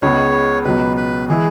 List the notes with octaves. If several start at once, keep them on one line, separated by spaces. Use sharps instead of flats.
C#2 C#3 G#3 B3 C#5
C#2 B2 F#3 B3 B4
B4
E3 G#3 E4 G#4